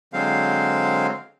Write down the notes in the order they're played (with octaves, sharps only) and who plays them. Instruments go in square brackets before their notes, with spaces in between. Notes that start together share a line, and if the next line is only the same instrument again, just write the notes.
[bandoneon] D3 F#3 G#3 C4 C5 F5